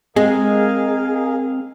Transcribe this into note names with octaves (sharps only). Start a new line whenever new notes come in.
G#3 C4 G#4 A#4 D#5 F5